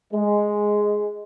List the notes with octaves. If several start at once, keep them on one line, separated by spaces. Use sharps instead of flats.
G#3